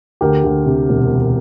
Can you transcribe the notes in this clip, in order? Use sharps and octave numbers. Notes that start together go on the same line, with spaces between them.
D2 G4 A#4
D2
C3
E1
E1